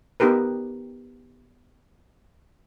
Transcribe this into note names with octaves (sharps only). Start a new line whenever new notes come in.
B3 D#4 G4 A#4 B4